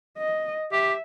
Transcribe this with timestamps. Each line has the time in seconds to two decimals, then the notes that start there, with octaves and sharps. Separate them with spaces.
0.18 D#5
0.72 G4 E5